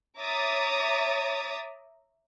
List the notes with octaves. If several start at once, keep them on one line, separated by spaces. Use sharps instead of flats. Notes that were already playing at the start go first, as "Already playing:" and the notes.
C#5 E5 A#5 D6 D#6 A6